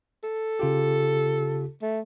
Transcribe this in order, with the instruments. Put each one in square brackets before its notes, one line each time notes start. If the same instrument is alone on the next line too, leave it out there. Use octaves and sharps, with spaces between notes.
[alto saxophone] A4
[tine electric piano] C#3 F4 G4
[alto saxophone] A3